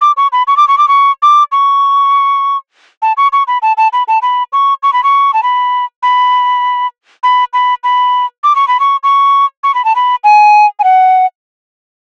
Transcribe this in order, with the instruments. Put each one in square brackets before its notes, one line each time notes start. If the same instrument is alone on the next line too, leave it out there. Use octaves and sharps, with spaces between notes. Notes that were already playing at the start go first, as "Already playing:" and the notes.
[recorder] D6
C#6
B5
C#6
D6
C#6
D6
C#6
D6
C#6
A5
C#6
C#6
B5
A5
A5
B5
A5
B5
C#6
C#6
B5
C#6
A5
B5
B5
B5
B5
B5
D6
C#6
B5
C#6
C#6
C#6
B5
A5
B5
G#5
G#5
F#5